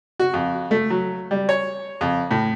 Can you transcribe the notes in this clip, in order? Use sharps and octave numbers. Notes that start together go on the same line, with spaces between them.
F#4
F2
A3
F#3
G3
C#5
F2
A2